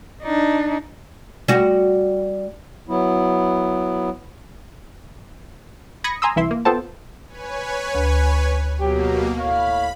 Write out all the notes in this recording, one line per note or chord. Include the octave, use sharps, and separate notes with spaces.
D4 D#4
G3 F#4
F#3 B3 E4
B5 D#6 G#6 A#6 C#7
G#5 A#5 C6 D#6 E6
C2 E3 E4 E5 C6
A#3
B3 F4 A4 C5 G5 A5
B4 C#5 G#5
D2
B2 F#3 A#3 G4
A2 C#5 F5 B5